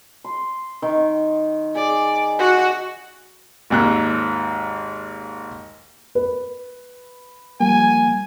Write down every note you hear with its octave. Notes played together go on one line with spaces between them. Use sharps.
C6
D#3
G#4 D5
F#4
G#1 D#2 F#6
B4
F3 G3 A#3 G#5